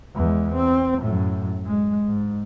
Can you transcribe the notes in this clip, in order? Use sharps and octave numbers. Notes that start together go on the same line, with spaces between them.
E2 G#3
C4
F#2 A2
G#3
G#2